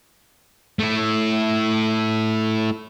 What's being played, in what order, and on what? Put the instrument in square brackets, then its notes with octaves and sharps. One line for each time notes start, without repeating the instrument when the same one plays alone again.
[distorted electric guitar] A3 E4